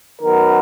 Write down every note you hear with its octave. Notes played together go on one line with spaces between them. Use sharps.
D#3 F#3 B3 A#4